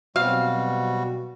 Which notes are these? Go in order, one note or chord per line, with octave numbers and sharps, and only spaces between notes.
B2 F#3 G3 C4 F#4 F5